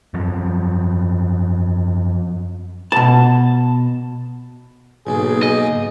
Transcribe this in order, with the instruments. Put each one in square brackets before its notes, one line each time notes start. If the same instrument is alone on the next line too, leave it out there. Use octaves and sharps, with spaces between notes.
[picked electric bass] F#2 F3
[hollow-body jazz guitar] B2 A5
[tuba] B1 [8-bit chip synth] G#2 C#3 A#3 [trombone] G#4
[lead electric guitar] D#5